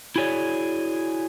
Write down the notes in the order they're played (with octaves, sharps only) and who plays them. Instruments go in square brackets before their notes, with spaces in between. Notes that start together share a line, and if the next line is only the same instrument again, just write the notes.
[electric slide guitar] E4 F#4 G#4 C#5 D5